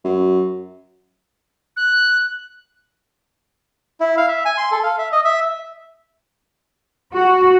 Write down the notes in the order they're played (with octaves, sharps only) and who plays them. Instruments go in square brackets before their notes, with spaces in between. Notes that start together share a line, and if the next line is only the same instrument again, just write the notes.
[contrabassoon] F#2
[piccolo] F#6
[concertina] E4
F5
E5
G#5
C6
A4
F5
E5
D#5
E5
[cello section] F#4